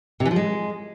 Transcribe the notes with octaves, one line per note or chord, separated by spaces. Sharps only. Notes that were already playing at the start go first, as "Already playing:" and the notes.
C3
E3
F3
G#3